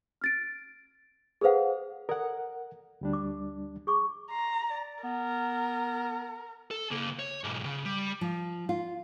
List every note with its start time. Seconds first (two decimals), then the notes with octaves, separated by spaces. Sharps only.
0.21 F6 A6 D7
1.41 G#4 A4 B4 C5 F5 F#5
2.09 A4 A#4 D5 F#5
3.01 D2 G3 D4
3.13 D6
3.87 G#4 C#6 D6
4.31 A#5 C6
4.70 D5
5.03 B3 A#4
6.71 A4
6.91 C#3 A#3
7.19 C#5
7.44 B1 G#2
7.66 C#3
7.85 G3
8.21 F3
8.69 F4